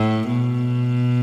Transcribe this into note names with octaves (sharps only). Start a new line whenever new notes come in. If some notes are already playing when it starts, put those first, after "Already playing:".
Already playing: A2
B2